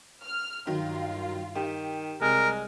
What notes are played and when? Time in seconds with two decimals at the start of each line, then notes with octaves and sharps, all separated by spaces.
0.24 F6
0.67 G2 D#3 F#3 F4
1.56 D#3 G4
2.22 C2 G#3 A#4